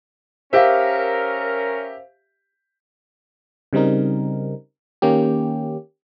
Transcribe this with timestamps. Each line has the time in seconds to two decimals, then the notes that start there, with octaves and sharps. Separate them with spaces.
0.53 C#4 G4 A#4 C5 E5 F5
3.73 C#3 G3 C4 D#4 A#4
5.02 D#3 A#3 C#4 G4